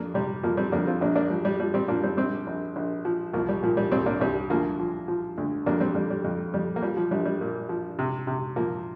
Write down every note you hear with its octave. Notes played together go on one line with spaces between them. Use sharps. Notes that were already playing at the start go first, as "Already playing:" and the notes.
Already playing: F2 A#3 D4
C3 G3
F2 F3 A#3
G3 C4
F2 A#3 D4
C4 F4
A#1 A#3 D4
A#3 D4
F3 G3
G3
F3 G3
G3 C4
F3 A#3 D4
G3 C4
A#1 G3 C4
A#1
A#1
F3
C2 F3 A#3
G3
A#2 F3
G3
C2 G3 C4
A#3 D4
C2 G3 C4
D2 F3 A#3
F3
F3
D2
F2 A#3 D4
G3 C4
F2 G3
G3
F2
F2 G3
A#3
F3 G3
F3
A#1 G3
G3
A#2
F3
C3
C3
F3 A#3